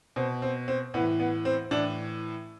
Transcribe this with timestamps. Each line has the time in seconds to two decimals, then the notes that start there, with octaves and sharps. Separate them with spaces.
0.16 B2 C4
0.42 C4
0.68 C4
0.94 A2 B3
0.97 E3
1.20 B3
1.45 C4
1.71 A2 E3 D4